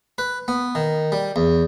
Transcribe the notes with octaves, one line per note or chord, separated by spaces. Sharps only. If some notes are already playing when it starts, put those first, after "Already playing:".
B4
B3
D#3
G3
E2